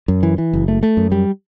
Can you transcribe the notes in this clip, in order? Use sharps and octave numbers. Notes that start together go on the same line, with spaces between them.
F#2
E3
E3
F#1
A3
A3
F#2
G3